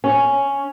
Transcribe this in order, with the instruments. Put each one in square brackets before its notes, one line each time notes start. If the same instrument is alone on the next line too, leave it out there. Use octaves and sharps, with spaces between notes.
[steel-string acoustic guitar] C#4